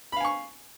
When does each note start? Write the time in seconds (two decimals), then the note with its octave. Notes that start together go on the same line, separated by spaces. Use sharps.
0.12 B5
0.16 F5
0.21 G#5
0.25 C#6